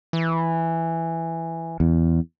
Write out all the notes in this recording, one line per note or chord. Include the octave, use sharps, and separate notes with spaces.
E3
E2